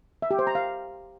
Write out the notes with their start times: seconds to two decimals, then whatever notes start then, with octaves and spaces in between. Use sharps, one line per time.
0.22 E5
0.31 G4
0.39 C5
0.47 A#5
0.55 F5